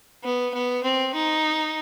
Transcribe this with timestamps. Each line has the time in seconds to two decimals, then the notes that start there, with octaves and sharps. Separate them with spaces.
0.24 B3
0.54 B3
0.84 C4
1.14 D#4